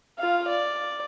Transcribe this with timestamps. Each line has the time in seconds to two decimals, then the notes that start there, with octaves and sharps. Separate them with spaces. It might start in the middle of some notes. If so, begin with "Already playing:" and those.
0.19 F4 F5
0.49 D5